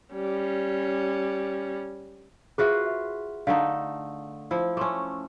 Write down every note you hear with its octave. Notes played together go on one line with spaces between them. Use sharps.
G3 C#4
F4 F#4 G#4 B4 C5 E5
E5
D3 A3 D#4 F5
F3 E4 F5
A3 C#4 C6 D6